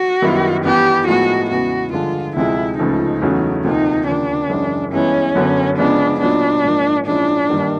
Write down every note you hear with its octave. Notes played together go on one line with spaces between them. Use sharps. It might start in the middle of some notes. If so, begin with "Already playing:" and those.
Already playing: F#4
F#2 D#3 G3 B3 E4
G2 E3 G3 B3 G4
A2 F3 G#3 B3 D#4 F#4
E2 C#3 E3 G#3 B3 F#4
G2 D3 F3 G#3 F4
D2 C3 F3 G#3 E4
C#2 C#3 F3 A3 D#4
E2 C#3 F#3 A3
D2 C3 F3 A#3 D#4
D#2 C#3 F3 D4
F#2 C#3 E3 G#3 C#4
G2 E3 G#3 B3 C#4 E4
F#2 D3 F#3 B3
C#3 F3 G#3 B3 D4
A#2 F#3 B3 D4 D#4
G#2 F3 A#3
A#2 F3 G#3 C#4 D4 E4
G2 D#3 G3 A#3